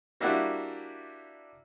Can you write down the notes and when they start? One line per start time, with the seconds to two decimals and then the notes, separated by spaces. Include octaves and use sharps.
0.21 G3 A#3 D4 E4 F#4